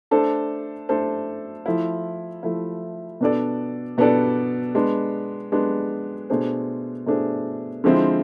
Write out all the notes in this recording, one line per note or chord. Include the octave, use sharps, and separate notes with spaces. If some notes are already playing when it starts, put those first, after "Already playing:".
A3 D4 A4 C5
A3 D4 A4 C5
F3 A3 E4
F3 A3 E4
B2 B3 D4 A4 D5
B2 B3 D4 A4 D5
G#3 B3 D4
G#3 B3 D4
B2 A3 D4 G#4 C5
B2 A3 D4 G#4 C5
D3 F3 G#3 C4 E4